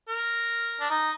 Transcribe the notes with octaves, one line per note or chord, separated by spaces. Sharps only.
A#4
D4
D#4